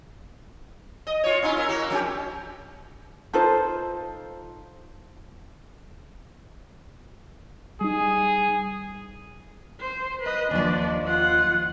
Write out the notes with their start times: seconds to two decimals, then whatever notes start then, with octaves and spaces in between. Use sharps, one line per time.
1.07 D#5
1.24 F4 C#5
1.43 C#4 D#4 F4
1.57 E4 A#4
1.68 A#3 F#4
1.90 F3 C#4 G4
3.33 D#4 F4 A4 C5
7.81 G3 D#4 G#4
9.80 C5
10.21 B4 D#5
10.51 D#2 F3 D4 D5
11.05 F4 F#5